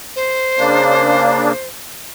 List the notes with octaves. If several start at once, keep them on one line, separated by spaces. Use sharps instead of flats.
C5
C#3 A#3 D4